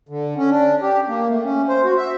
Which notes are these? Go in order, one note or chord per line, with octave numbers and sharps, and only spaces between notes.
D3
C#4
D4
G4
A#3
A3
C#4
C5
F#4
E5